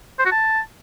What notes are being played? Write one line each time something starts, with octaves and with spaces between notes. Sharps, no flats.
C5
F#4
A5